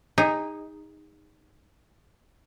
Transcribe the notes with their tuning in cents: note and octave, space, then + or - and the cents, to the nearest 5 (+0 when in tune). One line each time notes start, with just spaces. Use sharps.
D#4 +0 G#4 -35